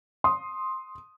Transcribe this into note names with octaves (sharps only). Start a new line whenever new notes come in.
C6 D#6